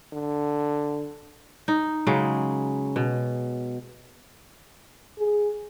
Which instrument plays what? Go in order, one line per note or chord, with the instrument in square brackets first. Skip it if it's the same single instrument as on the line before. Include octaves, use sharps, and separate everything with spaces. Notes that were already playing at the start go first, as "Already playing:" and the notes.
[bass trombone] D3
[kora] D#4
C#3 F#3 G#3
B2
[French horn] G#4